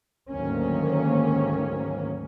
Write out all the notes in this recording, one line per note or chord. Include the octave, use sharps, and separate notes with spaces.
D2 G#2 D#3 F#3 A#3 C#4